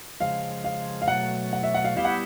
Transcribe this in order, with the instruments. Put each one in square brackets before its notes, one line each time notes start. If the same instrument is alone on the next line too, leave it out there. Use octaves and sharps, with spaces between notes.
[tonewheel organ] C#3 F3 G#3 [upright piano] F5
[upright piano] F5
F5
[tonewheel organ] B2 F#3 A3 [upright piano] F#5
[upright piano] F#5
E5
F#5
F5
[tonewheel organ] G3 B3 E4 G4 [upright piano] F5
[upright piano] F#5